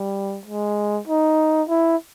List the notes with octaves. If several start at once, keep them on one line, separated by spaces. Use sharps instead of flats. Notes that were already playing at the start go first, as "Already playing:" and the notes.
Already playing: G3
G#3
D#4
E4